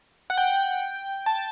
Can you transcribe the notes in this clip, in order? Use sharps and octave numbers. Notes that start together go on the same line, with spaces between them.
F#5
G5
A5